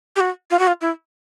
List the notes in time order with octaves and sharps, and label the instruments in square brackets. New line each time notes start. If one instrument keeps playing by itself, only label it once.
[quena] G4
F#4
F4
F#4
F4
E4